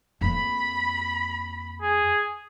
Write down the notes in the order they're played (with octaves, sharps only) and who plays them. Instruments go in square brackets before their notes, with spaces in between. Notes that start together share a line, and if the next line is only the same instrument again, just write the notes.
[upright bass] F2 A#3 [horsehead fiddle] B5
[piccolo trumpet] G#4